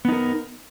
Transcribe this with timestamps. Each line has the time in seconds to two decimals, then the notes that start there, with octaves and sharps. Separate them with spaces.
0.05 B3
0.09 D#4
0.12 A#4